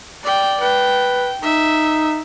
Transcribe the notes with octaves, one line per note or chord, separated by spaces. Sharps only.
D5 G5
B4 G5
D#4 E5